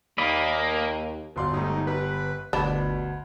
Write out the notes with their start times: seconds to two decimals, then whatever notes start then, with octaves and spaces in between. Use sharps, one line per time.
0.18 D#2 A#3 D5 D#5 B5
1.36 G1 F#3 F4 D5 C6
1.53 G#2 G3 A3 D#4
1.87 G3 B4
2.53 G1 D2 B2 D4 B5 E7